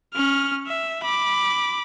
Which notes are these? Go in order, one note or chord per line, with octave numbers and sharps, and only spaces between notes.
C#4 F6
E5
B5 D6